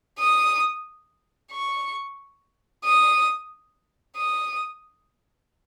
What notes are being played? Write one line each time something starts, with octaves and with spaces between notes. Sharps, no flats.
D#6
C#6
D#6
D#6